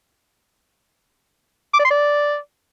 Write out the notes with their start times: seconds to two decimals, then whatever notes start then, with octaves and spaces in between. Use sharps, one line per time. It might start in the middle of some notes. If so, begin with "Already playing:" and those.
1.74 D6
1.79 D5
1.85 C6
1.90 D5